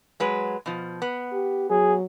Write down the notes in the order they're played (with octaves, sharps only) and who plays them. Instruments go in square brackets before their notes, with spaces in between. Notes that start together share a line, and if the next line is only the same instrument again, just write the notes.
[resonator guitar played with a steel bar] F#3 G#3 B4
B2 F3
B3
[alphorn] G4
[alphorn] F#3 [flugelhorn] G#4